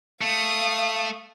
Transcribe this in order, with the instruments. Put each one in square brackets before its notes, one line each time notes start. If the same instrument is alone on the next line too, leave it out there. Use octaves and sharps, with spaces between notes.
[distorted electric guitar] A3 [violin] F5 D#6